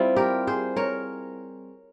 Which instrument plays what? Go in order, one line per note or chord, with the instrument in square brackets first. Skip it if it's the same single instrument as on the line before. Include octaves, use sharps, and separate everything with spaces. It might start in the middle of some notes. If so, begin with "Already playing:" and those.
Already playing: [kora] G3 C4 E4 F4
G4 A#4
G#4 C5
A#4 C#5